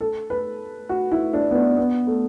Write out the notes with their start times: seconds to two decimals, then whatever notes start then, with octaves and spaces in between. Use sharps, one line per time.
0.01 A4
0.30 B4
0.89 F#4
1.12 E4
1.33 D4
1.51 B3
1.55 D4
1.77 B3
2.07 A3